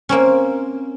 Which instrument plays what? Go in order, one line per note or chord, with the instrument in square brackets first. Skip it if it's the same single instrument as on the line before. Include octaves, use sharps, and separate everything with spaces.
[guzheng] A#3 C4 C#4